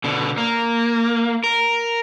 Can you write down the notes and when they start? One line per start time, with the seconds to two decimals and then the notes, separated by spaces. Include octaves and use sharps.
0.04 B2 D3
0.38 A#3
1.44 A#4